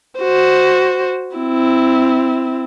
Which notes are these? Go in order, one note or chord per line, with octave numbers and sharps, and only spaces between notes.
F#4 C5
C4 E4